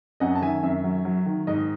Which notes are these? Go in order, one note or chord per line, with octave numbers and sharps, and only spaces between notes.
F#2 D#5 F#5
A5
D#3 E5 G#5
F#2 E5
F#3
F#3
D#3
G#2 D#5